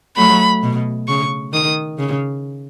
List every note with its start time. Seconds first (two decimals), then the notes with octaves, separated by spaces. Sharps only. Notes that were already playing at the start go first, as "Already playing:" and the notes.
0.17 F#3 A3 B5
0.63 B2
1.08 C#3 C#6
1.53 D#3 D#6
1.98 C#3